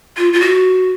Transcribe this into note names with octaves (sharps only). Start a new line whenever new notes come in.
F4
F4
F#4